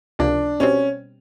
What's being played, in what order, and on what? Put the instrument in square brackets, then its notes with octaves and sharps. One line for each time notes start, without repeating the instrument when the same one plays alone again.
[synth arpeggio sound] C#2 C3 F3 A#3 [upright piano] D4
[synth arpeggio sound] B2 G3 C4 [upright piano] C#4